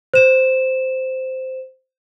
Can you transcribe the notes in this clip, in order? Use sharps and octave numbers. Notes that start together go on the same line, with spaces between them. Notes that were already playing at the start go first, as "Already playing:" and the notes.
C5 E7